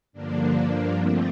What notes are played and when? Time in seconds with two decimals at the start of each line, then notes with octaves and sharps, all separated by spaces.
0.13 G2 D3 F3 A#3 D4
0.55 G2 F3 A#3 D4
0.98 D3 F3 A3 C4